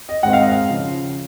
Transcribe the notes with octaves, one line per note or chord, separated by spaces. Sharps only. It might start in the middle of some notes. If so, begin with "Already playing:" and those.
D#5
G#2 D#3 G#3 C4 F#5
F5
D#5
F5
C#3 F3